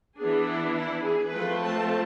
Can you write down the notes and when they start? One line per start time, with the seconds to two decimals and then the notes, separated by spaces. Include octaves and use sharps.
0.18 E3 B3 D4 G#4
0.47 E4
0.75 E4
1.05 G#4
1.33 F3 A3 C4 B4
1.62 A5